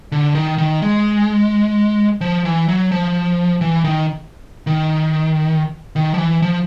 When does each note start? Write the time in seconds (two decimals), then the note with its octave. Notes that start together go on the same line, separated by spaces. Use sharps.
0.12 D3
0.35 D#3
0.58 D#3
0.82 G#3
2.21 F3
2.45 E3
2.68 F#3
2.92 F3
3.61 E3
3.84 D#3
4.67 D#3
5.96 D#3
6.14 F3
6.18 E3
6.42 F3